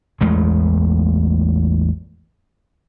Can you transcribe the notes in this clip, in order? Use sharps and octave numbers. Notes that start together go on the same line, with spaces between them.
A1 E2 G#3 A3